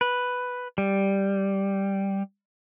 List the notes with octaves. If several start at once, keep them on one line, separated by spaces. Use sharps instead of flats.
B4
G3